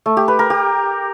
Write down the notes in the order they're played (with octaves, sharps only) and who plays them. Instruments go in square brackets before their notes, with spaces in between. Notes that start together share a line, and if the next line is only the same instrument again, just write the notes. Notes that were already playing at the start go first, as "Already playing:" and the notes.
[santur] A3
G4
B4
A#4
G4